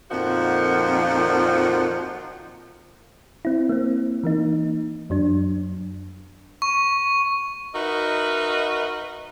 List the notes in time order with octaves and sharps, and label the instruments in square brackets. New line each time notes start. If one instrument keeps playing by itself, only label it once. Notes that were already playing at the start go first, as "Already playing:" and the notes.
[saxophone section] F2 A#2 D#3 F3 F#4 F#5
[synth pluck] C4 E4
A#3 C4
E3 A#3 D#4
F#2 F#3 D4
[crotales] C#6
[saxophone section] D#4 F#4 A#4 B4 D#5 E5